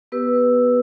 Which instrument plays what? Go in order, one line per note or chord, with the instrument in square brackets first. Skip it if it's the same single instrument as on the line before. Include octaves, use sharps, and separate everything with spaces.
[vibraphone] B3 G4 B4 E6